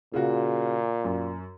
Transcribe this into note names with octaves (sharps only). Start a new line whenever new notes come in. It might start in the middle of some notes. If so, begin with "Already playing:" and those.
A#2 C#3 F4 F#4
F#2